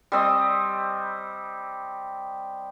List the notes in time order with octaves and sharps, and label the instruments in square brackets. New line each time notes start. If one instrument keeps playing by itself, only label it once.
[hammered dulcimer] G3 C4 D#5